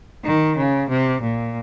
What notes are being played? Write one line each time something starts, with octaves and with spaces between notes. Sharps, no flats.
D#3
C#3
C3
A#2